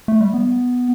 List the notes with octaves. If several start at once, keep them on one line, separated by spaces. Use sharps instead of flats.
A3
G3
B3